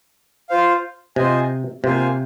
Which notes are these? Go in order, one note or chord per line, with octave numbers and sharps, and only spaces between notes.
F4 C5 F5
C3 F4 C5 D#5 G#5
C3 A#3 F4 C5 F5 G#5